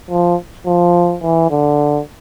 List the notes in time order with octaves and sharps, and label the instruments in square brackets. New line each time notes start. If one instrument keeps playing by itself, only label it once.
[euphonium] F3
F3
E3
D3